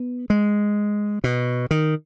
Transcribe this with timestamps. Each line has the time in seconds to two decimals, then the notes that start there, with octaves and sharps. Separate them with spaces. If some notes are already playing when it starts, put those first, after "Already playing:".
Already playing: B3
0.30 G#3
1.24 B2
1.71 D#3